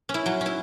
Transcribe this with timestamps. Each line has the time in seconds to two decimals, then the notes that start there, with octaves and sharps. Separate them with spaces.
0.09 C#4
0.14 E4
0.26 F#3
0.41 C#4 E4